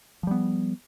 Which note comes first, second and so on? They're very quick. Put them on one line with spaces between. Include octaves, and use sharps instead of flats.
F3 G3 B3